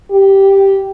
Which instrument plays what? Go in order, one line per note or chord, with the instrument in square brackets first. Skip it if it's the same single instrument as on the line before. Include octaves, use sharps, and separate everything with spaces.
[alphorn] G4